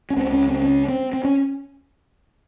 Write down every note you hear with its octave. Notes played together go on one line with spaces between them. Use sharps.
C#4
C#2 C#3 C4
C#4
C4
C#4
C4
C4
C#4